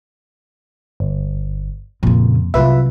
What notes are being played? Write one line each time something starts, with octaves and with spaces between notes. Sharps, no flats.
G1
F2 A#2 C#3
C2 F#3 F4 B4 E5